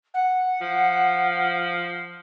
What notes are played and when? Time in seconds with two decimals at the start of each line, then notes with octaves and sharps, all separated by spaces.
0.14 F#5
0.61 F3